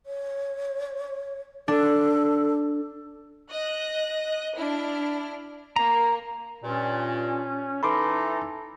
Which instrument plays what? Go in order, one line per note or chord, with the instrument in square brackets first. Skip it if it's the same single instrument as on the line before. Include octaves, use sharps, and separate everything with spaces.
[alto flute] C#5
[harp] D4 [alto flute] A4
[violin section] D#5 F#6
D4 E4 F6
[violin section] A#3 [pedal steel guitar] A#5
[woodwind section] G2 A#2 [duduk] C#4
[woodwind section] E3 D#4 [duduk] A4 [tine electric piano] B5 C6 D6